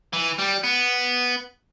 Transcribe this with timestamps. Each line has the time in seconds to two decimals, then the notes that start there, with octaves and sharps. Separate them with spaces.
0.13 E3
0.38 G3
0.63 B3